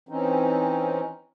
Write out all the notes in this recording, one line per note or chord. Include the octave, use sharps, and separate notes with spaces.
E3 C4 C#4 D#4